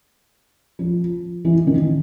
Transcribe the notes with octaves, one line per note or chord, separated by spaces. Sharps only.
F3
E3
D#3